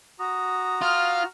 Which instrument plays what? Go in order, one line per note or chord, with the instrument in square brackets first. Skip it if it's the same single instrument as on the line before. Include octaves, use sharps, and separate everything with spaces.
[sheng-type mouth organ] F#4 A#5 [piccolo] D#6
[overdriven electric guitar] F4 [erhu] F6